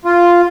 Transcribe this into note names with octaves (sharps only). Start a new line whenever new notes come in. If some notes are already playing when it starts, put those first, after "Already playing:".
F4